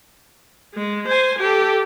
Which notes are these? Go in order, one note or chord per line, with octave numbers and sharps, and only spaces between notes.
G#3
C5 G#5
G4 A4